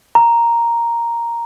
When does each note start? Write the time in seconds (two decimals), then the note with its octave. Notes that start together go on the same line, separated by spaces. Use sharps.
0.15 A#5